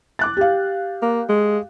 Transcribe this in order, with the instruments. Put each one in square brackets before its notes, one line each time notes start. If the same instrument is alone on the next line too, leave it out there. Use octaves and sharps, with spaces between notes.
[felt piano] D6 F#6 A6
G4 F5
[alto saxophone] A#3
G#3